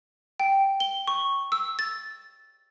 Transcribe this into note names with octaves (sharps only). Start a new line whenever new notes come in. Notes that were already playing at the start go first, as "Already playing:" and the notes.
G5
G7
C#6
E6
A6